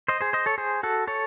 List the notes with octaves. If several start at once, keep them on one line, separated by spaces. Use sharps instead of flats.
C5 D#5
G#4 C5
C5 D#5
A4 C#5
G#4 C5
F#4 A4
A4 C#5